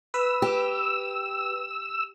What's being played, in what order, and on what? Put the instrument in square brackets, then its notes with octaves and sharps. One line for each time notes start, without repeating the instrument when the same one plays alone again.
[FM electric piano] B4 [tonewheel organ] E6
[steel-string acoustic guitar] G4